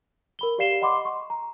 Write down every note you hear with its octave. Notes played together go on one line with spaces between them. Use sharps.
A#4 B5 G7
G4 D5 F5 C7 E7 G7
D#5 F#5 B5 C6 D6
C6 C#6
A#5